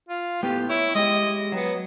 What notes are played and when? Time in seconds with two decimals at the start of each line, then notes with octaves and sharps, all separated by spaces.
0.08 F4
0.43 A2 B3 G4
0.69 E4 C#5
0.95 G#3 G4 D#5
1.52 F#3 B3